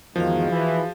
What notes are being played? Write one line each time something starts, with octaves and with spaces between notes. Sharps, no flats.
E2 G#2 D#3 F3 F#4 G#4 F5
E3